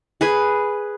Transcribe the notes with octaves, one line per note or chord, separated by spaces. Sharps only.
G#4 B4 G#5